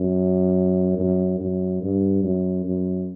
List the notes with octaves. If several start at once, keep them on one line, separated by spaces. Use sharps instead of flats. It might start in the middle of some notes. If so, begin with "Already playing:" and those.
Already playing: F#2
F#2
F#2
G2
F#2
F#2